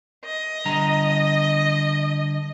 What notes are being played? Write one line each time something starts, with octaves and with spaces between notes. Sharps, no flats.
D#5
D3 G3 A#5